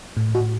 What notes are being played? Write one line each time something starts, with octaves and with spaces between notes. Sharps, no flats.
A2
F#4